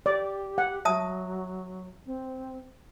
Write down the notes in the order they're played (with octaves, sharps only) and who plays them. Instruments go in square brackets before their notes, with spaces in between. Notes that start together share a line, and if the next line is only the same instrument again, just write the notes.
[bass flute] G4 [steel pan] D5
[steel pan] F#5
[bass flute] F#3 [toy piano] E5 A5 D#6
[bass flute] C4